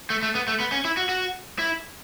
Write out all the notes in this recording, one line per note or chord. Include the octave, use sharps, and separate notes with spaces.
A3
A3
B3
A3
B3
C#4
E4
F#4
F#4
E4